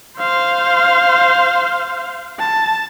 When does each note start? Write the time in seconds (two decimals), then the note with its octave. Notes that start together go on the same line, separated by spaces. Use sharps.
0.18 C5 F5
2.39 A5